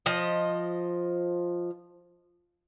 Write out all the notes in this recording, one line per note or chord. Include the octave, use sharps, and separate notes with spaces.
F3 D#5